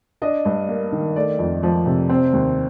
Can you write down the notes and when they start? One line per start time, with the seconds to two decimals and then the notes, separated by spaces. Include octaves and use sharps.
0.22 D4 D#5
0.45 G2
0.69 A#3
0.92 D#3
1.16 A3 D5
1.39 F2
1.63 F3
1.86 C3
2.09 C4 C5
2.33 D#2